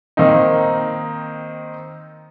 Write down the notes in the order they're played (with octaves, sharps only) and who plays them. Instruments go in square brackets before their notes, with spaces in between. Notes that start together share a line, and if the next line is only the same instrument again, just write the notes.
[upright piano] D#3 A#3 C4 D#4